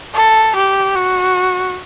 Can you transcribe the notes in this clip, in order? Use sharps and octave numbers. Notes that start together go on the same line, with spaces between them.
A4
G4
F#4